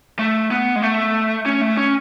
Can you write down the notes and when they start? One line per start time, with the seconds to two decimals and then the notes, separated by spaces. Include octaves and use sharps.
0.19 A3
0.51 B3
0.76 G#3
0.82 A3
1.46 C#4
1.61 A3
1.77 C#4